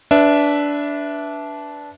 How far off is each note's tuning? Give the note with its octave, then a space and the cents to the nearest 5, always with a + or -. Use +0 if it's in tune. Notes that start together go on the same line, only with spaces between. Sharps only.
D4 -15 B4 +0 E5 +0